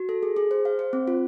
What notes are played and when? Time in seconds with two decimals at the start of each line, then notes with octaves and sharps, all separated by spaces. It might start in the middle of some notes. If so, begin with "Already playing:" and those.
Already playing: F#4
0.09 A4
0.23 G#4
0.36 G#4
0.51 C5
0.65 F5
0.79 C5
0.93 C4
1.08 F4